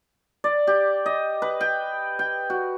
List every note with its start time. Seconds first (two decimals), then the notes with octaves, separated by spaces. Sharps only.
0.44 D5
0.67 G4
1.06 D#5
1.42 B4
1.61 G5
2.19 G5
2.50 F#4